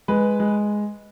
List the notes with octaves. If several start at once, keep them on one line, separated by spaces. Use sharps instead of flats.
G#3 B4
G#3